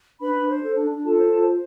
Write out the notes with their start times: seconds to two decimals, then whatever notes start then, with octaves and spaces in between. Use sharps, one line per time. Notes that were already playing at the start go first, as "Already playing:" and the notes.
0.19 D4 B4 B5
0.33 D4
0.48 C5
0.61 A4
0.76 D4
0.90 D4
1.04 F4 A4 A5
1.18 C5
1.32 F4
1.47 C5